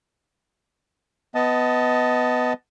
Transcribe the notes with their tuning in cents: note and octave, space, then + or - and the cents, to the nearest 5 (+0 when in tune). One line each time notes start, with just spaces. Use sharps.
B3 +10 D#5 +15 A5 +0